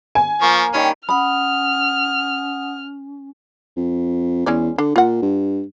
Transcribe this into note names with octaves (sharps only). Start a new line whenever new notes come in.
G#5
F3 A#3 C#6
D#3 G3 C#4
C#4 F#5 B5 D#6 F6
F2
E2 G#3 C#4 D5
D3 D4
A#2 F4 F#5
G2